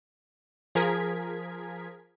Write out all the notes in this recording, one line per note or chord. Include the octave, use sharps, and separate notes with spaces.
F3 G#4 A#4 G#6 B6